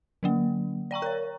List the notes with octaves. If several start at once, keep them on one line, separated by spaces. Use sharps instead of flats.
D3 F#3 A#3
D5 G5 A#5 C#6
A#4 C#5